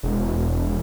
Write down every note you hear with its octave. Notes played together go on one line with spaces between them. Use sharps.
E1